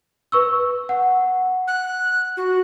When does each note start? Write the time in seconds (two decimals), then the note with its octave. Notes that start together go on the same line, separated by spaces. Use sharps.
0.32 B4 C#6 E6
0.89 F#5
1.68 F#6
2.37 F#4